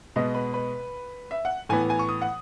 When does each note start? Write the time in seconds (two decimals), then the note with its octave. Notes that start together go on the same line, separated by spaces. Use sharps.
0.16 B2 G#3 B3 D#5
0.34 B4
0.54 B4
1.31 E5
1.45 F#5
1.69 A2 E3 B3 G#5
1.90 G#5
1.99 C#6
2.09 D#6
2.21 F#5